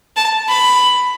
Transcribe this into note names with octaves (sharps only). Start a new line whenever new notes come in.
A5
B5